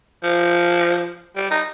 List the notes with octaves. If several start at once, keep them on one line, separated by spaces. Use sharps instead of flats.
F3
G3
D#4